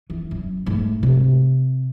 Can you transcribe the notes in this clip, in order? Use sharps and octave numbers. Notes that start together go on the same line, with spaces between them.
E3
F#2
G#2 A3
C3